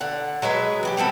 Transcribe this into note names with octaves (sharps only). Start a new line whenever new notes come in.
D3 F#5
F#3 G#3 G#4 B4
E3 F#4 G4
G3 B3 C4 A4